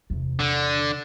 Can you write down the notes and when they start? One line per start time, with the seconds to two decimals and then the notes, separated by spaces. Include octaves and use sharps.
0.10 E2 C3
0.39 D3